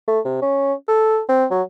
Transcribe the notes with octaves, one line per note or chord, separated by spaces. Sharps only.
A3
C3
C#4
A4
C4
F#3